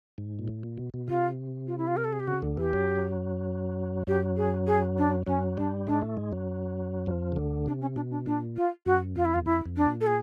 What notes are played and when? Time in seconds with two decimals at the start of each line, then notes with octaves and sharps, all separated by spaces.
0.18 G#2
0.39 A#2
0.48 A2
0.63 A#2
0.78 B2
0.94 B2
1.08 C3 F4
1.67 F4
1.78 E4
1.87 F4
1.97 A#4
2.04 A4
2.13 G#4
2.20 G4
2.27 C#3 F#4
2.42 D2 D3
2.57 E2 E3 G4
2.73 F#2 F#3
4.07 F#2 F#3 G4
4.37 G#4
4.67 G#4
4.98 D4
5.27 F#2 F#3 C#4
5.57 G2 G3 D4
5.87 G#2 G#3 D4
6.02 A2 A3
6.17 G#2 G#3
6.32 F#2 F#3
7.06 F2 F3
7.32 C#3
7.36 D2 D3
7.66 C3 D4
7.81 C#4
7.96 B2 D4
8.11 D4
8.26 A#2 D4
8.56 F4
8.86 F#2 F#4
9.16 F2 F4
9.25 E4
9.34 E2 F4
9.46 F2 E4
9.66 F2
9.77 D4
9.86 A#2
10.01 A4
10.07 G#4